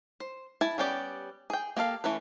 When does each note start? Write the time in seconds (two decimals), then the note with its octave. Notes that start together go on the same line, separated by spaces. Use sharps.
0.20 C5
0.61 E4 G#5 A5
0.78 G3 B3 C#4 G4 D5
1.50 G#4 G5
1.77 A#3 G4 A4 F5
2.04 E3 A3 C#4 B4